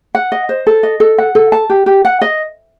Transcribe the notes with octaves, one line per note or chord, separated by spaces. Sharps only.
F#5
D#5
C5
A4
D#5
A4
F#5
A4
A5
G4
G4
F#5
D#5